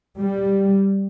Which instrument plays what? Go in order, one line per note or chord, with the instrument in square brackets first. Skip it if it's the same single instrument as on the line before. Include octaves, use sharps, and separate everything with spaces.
[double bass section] G3